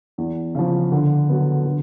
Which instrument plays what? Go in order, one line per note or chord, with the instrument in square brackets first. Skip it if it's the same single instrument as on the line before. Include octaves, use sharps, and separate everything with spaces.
[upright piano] E2
C#3 F3
D3
F#3 B3
D3